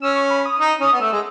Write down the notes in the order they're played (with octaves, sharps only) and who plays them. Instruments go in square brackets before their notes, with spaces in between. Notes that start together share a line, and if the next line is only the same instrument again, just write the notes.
[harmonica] C#4 [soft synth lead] E6
[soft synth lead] C#6
B5
D#6
[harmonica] D#4 [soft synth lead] D#6
[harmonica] C#4 [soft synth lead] D#6
[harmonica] B3
[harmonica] A3 [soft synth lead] E6
[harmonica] G#3